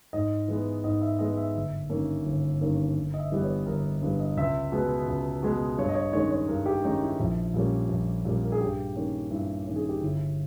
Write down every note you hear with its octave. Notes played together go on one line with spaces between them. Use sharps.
G#2 D#5
E3 G#3 B3
G#2 D#5
E5
E3 G#3 B3 D#5
E5
G1 E5
G2 D#3 A#3 C#4
G1
G2 D#3 A#3 C#4
G1
D#5
E5
G2 E3 G3 B3
C#5
G1 A#4
G2 E3 G3 B3 B4
D#5
C#2 E5
B2 G#3 B3
C#2
B2 G#3 B3
G2 C#5
D#5
C#5
D#3 G#3 C#4 C#5
C#5
G2 A#4
G4
D#3 G#3 C#4 D#4
E4
A#1
A#2 G3 A#3 C#4
A#1
A#2 G3 A#3 C#4
A#4
G#4
G2 G4
D#3 A#3 C#4
G2 E4
D#3 A#3 C#4
G#4
G4
G1 E4